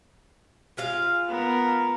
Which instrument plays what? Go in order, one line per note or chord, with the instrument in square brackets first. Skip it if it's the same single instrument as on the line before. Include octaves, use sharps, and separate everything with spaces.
[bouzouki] G#3 F4 F5
[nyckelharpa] B3 A#4